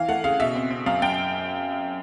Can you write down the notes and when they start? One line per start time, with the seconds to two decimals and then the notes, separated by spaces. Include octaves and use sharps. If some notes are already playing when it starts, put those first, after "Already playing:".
Already playing: E3 F5
0.08 A3 F#5
0.24 C#3 F5
0.40 B2 E5
0.55 C4
0.71 C4
0.86 F#2 F5
1.02 F#2 G5